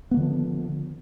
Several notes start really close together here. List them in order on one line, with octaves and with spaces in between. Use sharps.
B3 A#3 D3 F3